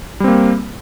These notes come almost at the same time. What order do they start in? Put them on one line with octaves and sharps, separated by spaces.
G3 C4 A#3